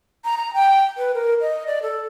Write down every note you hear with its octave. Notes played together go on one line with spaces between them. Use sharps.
A#5
A#5
G5
B4
A#4
D#5
D5
A4